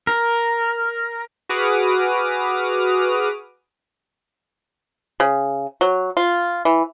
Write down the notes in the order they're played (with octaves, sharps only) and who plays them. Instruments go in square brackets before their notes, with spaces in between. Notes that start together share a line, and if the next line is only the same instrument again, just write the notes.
[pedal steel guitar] A#4
[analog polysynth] F#4 G#4 B4 D6 D#6 F6
[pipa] C#3
F#3
F4
E3